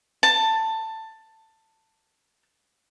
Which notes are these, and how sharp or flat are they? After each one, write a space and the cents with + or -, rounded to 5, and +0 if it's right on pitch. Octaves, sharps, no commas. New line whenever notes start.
A5 +15